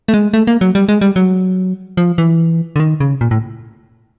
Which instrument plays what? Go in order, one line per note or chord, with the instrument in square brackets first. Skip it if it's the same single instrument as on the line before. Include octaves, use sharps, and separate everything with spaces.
[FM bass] A3
G#3
A3
A#3
F#3
G3
G#3
G3
F#3
F3
E3
D3
D#3
C#3
A#2
A2